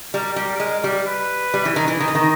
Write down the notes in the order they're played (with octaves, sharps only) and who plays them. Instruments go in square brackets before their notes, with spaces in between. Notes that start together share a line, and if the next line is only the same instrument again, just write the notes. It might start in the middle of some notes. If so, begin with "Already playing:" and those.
[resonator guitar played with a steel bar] G3 [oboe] A#4
[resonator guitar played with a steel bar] G3
G#3
G3
[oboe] B4
[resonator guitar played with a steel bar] G3
E3
D#3
E3
[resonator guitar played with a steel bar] D#3 [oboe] D#5
[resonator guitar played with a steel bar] E3
D#3